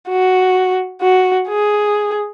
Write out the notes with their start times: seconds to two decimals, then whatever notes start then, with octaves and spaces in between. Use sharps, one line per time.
0.08 F#4
1.01 F#4
1.48 G#4